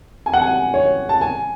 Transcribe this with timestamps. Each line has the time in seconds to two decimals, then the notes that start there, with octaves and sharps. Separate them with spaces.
0.26 G#5
0.33 F#5
0.42 G#5
0.74 C#5
1.09 A5
1.21 G#5